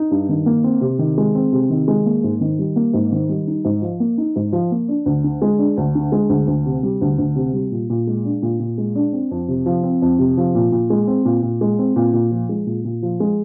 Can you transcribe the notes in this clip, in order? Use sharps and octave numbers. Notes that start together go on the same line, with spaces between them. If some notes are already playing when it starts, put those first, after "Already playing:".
Already playing: D#4
G2
D#3
A#3
C4
C3
D#3
G#3
C4
C3
D#3
G#3
A#3
G#2
D#3
G3
A#3
G#2
D#3
G3
D#4
G#2
F3
A#3
D#4
G#2
F3
A#3
D4
D2
D3
G#3
D4
D2
D3
G#3
D2
D2
C3
G3
D2
D2
C3
G3
A#2
A#2
G#3
D4
A#2
A#2
G#3
D4
C4
F2
C3
F3
C4
F2
C3
F3
A#2
A#2
G#3
C4
A#2
A#2
G#3
C4
A#2
A#2
F3
G#3
A#2
A#2
F3
G#3